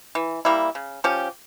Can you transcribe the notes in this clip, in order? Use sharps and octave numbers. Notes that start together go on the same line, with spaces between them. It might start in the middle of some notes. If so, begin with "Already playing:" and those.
E3
G3 A#3 E4
C#3
F3 C#4 G4